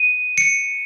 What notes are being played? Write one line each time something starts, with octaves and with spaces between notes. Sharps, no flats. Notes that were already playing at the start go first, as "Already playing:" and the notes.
Already playing: D#7
C#7